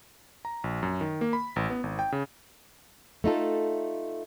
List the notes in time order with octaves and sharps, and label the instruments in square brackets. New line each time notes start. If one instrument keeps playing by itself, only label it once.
[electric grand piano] A#5
A#1
F#2
D#3
A#3
B5
A1
B3
G#1
G5
C#3
[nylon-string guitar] A3 D#4 F4 A4